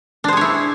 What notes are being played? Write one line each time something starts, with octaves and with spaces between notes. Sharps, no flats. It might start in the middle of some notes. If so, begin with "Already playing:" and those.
D4 E4 G#4 C5 C#5